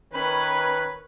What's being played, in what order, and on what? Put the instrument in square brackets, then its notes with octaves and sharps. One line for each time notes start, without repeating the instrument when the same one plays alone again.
[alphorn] D#3 [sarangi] C#4 [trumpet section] B4 [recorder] B5